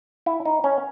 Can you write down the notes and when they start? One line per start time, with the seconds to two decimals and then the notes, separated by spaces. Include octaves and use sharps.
0.26 E4
0.45 D#4
0.64 C#4